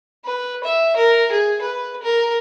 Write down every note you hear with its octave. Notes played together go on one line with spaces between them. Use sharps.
B4
E5
A#4
G#4
B4
A#4